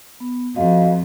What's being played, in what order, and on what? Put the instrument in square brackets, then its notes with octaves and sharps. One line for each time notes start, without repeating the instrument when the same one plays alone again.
[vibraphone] B3
[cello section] F2 [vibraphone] F#4 D#5 F5